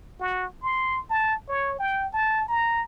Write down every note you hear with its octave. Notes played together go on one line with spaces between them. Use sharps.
F#4
C6
A5
C#5
G5
A5
A#5